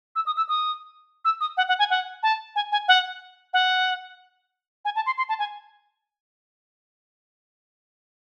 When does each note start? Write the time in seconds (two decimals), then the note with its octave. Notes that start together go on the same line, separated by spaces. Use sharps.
0.15 E6
0.26 D#6
0.37 E6
0.49 D#6
1.25 E6
1.40 D#6
1.57 F#5
1.68 F#5
1.79 G#5
1.90 F#5
2.23 A5
2.56 G#5
2.72 G#5
2.88 F#5
3.53 F#5
4.85 G#5
4.96 A5
5.06 C6
5.18 C6
5.29 A5
5.39 G#5